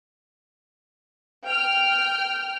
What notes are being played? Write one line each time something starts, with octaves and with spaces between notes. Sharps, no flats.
G5 F6